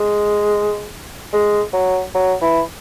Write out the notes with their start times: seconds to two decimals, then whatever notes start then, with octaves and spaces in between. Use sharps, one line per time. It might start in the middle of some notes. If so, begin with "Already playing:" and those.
Already playing: G#3
1.33 G#3
1.73 F#3
2.15 F#3
2.42 E3